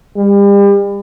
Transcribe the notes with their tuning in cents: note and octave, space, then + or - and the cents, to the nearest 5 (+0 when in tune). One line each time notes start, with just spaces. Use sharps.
G3 +40